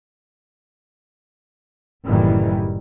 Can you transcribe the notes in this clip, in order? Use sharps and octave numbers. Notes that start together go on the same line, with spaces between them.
F#1 A2 D#3 E3 G3